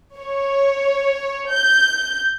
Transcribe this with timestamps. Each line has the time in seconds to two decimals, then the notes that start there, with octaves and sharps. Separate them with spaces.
0.17 C#5
1.50 G6